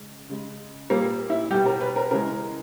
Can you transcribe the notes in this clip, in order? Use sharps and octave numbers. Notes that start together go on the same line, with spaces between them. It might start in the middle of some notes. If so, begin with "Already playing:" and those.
Already playing: C#3 G#3
C#3 G#3
A#2 G3 A#3
E4
B2 G3 G4
A#4
B4
A#4
C#3 E3 G#3 A#4